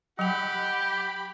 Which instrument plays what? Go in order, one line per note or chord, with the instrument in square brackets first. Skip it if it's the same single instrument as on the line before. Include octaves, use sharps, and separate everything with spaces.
[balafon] F#3 G5 [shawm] G4 [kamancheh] F#5 B5
[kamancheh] B5